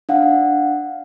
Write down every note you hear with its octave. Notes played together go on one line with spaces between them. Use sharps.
D4 F5 F#5